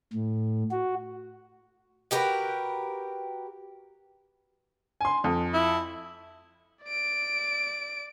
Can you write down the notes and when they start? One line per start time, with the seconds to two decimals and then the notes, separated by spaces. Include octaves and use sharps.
0.14 A2
0.71 F#4
2.11 F#4 G4 A#4 B4
5.01 G#5 C6
5.24 F2
5.53 E4
6.85 D5 D7